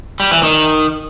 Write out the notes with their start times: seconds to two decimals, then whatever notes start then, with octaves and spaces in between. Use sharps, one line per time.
0.20 G3
0.31 E3
0.43 D#3